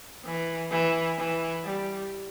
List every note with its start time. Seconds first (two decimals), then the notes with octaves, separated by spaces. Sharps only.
0.25 E3
0.72 E3
1.18 E3
1.64 G3